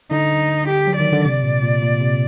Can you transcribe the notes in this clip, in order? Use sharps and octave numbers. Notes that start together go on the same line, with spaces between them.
D3 D#4
G4
F#3
D#3 D5
D3
C3 D5
A#2
A#2
A#2
C3